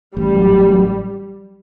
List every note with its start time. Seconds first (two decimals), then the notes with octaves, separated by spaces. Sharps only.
0.16 A1 G3
0.34 F#3
0.51 A1
0.69 F#3